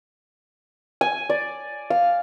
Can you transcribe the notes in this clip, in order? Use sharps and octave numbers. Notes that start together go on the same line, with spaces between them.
G#5
D5
F5